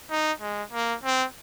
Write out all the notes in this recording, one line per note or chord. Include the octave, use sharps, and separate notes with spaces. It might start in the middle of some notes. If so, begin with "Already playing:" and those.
D#4
G#3
A#3
C4